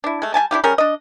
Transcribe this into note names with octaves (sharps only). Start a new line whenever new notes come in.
D4 E4
G#3 A3
G3 E4 G#5 A5
D4 E4 F4 G4
G3 C#4 G#4 A#4
D4 D#5